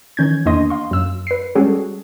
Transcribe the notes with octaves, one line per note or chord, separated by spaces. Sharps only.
D#3 E3 C#4 G6 G#6
E2 A#3 D4 D#5 C6
F5 C6
F#2 E6
B4 C7
G3 G#3 C#4 F#4 G#4 A4